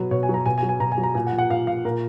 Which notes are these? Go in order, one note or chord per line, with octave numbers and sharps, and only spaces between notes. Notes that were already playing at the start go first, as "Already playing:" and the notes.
Already playing: B2 F#3 B4
B2 C#5
G#5
F#3
A#5
B2 G#5
G#5
F#3
G#5
B2 A#5
G#5
F#3
A#5
A#2 G#5
F#5
F3
F#5
A#2 F5
F3 F5
A#2 A#4